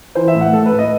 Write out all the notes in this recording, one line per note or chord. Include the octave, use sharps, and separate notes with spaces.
E3 C5
E5
A2
F#5
A3 A4
B4
A2
D#5